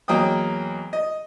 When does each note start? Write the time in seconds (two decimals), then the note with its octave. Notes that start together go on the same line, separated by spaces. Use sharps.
0.08 E2 F#3 A#3 D#5 G5 D#6
0.93 D#5